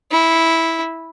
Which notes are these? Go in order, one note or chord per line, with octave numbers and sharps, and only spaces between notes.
E4